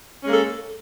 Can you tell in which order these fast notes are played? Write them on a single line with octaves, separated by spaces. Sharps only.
C#4 G#3 A#3 A4